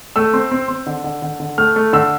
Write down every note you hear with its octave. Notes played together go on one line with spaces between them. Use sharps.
A3 E6
C4
C4
C4
D3
D3
D3
D3
A3 F6
A3
D3 E6